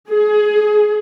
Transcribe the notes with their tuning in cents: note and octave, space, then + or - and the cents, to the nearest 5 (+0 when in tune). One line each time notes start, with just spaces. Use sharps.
G#4 +25